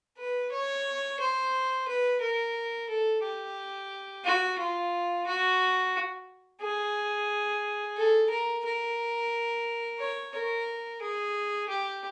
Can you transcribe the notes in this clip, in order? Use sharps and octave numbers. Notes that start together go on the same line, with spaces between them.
B4
C#5
C5
B4
A#4
A4
G4
F#4
F4
F#4
G#4
A4
A#4
A#4
C#5
A#4
G#4
G4